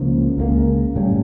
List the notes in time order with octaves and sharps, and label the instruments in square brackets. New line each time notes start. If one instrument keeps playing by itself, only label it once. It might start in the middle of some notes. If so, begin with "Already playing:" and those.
Already playing: [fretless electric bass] C#2 C#3 F3 A#3
C#2 C#3 F3 A#3
A2 G3 C#4